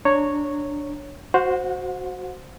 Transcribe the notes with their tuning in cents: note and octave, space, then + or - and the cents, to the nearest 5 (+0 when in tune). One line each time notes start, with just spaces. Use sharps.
D4 +0 C#5 +0 A#5 -20
F#4 +0 C5 +0 F#5 -40